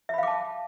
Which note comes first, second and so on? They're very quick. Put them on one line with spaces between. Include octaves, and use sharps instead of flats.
E5 B5 F5 D6 A5